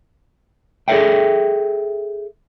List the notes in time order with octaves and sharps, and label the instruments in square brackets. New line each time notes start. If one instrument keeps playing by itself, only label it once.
[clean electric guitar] G#4 A4 B4 C5 E5 G5